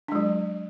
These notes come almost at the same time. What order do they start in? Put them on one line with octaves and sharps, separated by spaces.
D4 G#3 F#3